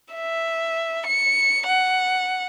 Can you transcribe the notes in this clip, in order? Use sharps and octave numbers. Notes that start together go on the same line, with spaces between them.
E5
C#7
F#5